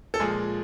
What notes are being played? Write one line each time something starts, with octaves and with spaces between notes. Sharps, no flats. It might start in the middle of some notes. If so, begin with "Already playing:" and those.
A4
A#2 F3 G#3 G#4